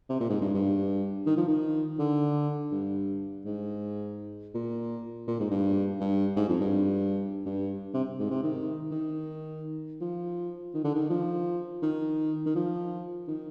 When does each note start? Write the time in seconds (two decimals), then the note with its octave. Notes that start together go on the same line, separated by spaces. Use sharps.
0.09 C3
0.20 A#2
0.29 G#2
0.41 G2
0.54 G2
1.27 D#3
1.37 F3
1.48 D#3
1.99 D3
2.72 G2
3.45 G#2
4.55 A#2
5.28 A#2
5.40 G#2
5.51 G2
6.00 G2
6.36 G#2
6.48 F2
6.60 G2
7.46 G2
7.94 C3
8.19 G#2
8.31 C3
8.43 D#3
8.92 D#3
10.01 F3
10.74 D#3
10.84 D3
10.95 D#3
11.10 F3
11.83 D#3
12.46 D#3
12.55 F3
13.28 D#3